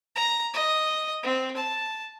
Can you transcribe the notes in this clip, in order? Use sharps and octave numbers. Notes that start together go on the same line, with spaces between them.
A#5
D#5
C4
A5